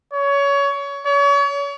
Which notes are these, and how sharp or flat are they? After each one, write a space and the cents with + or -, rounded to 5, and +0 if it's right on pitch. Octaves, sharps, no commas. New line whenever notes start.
C#5 +25
C#5 +35